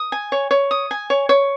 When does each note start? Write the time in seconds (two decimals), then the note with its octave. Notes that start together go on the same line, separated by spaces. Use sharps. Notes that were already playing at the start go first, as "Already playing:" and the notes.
Already playing: D#6
0.12 G#5
0.32 C#5
0.51 C#5
0.71 D#6
0.91 G#5
1.10 C#5
1.29 C#5